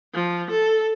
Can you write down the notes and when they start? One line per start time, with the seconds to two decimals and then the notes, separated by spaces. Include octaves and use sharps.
0.14 F3
0.51 A4